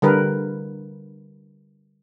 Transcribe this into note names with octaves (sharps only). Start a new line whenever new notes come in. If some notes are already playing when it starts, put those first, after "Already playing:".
D3 G3 A#4 B4